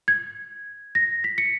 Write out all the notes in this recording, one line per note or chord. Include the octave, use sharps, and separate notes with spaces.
G#6
A#6
B6
C#7